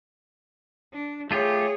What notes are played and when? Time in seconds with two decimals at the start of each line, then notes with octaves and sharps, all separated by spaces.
0.93 D4
1.31 A3 F4 G4 G#4 C#5